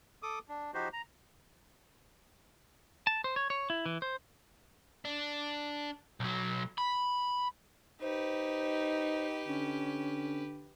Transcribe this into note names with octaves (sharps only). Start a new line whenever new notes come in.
A4 D6 D#6
D4
F3 D#4 F#4 G4 C5
A#5
A5
C5
C#5
C#5
E4
E3
C5
D4
B1 F#3
B5
D#4 G4 B4 C5
D3 C#4